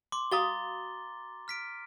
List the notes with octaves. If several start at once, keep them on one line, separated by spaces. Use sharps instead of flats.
C6 D6
F#4 F5 A#5 D#6 A6 G7
F6 B6 D7